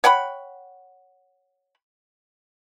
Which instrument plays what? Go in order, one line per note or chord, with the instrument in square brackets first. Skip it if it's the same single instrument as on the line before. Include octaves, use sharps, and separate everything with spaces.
[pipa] C#5 F#5 G5 B5